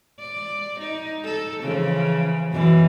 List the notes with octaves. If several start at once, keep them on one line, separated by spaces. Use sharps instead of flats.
D5
D#4
A4
C#3 E3 F3
F#2 B2 E3